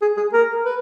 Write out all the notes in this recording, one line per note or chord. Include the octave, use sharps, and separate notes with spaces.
G#4
G#4
A#4
B4